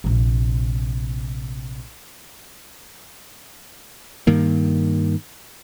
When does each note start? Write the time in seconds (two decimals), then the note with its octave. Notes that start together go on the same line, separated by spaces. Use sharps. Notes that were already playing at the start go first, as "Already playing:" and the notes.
0.04 A#1 C3
4.27 G2 D#3 A#3